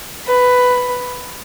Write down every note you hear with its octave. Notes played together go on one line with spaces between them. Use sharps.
B4